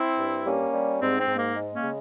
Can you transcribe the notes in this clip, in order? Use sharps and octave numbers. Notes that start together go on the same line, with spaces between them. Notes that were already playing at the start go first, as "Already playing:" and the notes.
Already playing: C4 E4
G2
G3 A#3 C#4
G3
G#2 C4
C4
G#2
A#3
G#3
A#3 C#4
C#3